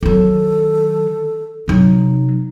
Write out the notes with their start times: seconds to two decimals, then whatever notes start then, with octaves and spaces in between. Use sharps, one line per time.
0.03 D#3 F#3 A4
1.68 C3 F#3 D#4